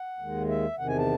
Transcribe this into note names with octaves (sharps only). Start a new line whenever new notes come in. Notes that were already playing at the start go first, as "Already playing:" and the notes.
Already playing: F#5
D#2 D#3 G#3
E5
E2 C3 D#3 F#5
G#5
A5